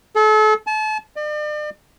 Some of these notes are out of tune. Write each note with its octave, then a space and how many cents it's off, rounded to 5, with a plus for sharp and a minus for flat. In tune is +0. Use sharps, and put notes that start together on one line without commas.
A4 -35
A5 -35
D5 +40